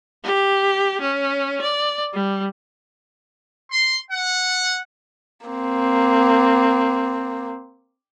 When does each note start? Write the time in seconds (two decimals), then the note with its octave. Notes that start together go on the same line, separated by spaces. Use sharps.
0.24 G4
1.01 C#4
1.61 D5
2.13 G3
3.71 C6
4.12 F#5
5.47 A#3 C4